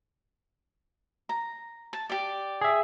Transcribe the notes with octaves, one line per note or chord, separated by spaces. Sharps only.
A#5
A5
G4 D5
G#4 E5